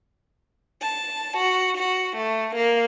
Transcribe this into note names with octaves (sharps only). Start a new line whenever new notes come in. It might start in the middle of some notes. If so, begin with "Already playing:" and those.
A5
F#4
F#4
A3
A#3